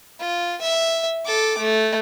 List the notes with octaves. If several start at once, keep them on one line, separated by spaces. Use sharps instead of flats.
F4
E5
A4 D6
A3